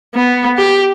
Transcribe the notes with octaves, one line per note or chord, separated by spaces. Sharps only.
B3
G4